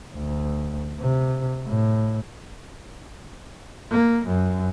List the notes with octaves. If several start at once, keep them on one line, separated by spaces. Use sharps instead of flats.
D2
C3
A2
A#3
F#2